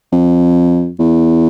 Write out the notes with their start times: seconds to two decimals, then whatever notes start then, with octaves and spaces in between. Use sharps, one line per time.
0.13 F2
0.99 E2